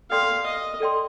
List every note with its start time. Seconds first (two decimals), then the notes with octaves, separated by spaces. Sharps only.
0.11 A4 D5 F5 G5 C6
0.46 D#5
0.80 A4 D5 G5 C6